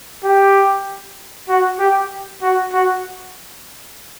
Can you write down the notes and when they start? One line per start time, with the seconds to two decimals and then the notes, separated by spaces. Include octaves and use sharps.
0.24 G4
1.49 F#4
1.79 G4
2.42 F#4
2.73 F#4